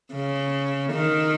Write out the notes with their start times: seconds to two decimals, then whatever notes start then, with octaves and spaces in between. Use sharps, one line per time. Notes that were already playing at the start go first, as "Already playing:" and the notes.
0.13 C#3
0.93 D#3